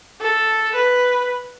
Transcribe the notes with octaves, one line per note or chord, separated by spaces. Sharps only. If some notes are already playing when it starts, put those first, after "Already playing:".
A4
B4